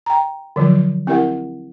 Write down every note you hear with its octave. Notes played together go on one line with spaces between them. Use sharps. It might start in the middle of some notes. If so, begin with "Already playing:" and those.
G5 A#5
D3 F3 F#3 F4
C4 E4 G4 A#4 E5 F#5